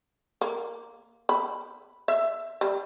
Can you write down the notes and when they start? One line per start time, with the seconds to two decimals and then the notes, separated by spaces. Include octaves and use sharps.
0.41 A#3
1.29 B5
2.08 E5
2.61 G3